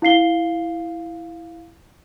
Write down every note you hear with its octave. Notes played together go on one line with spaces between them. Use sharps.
E4 F5 C7 G7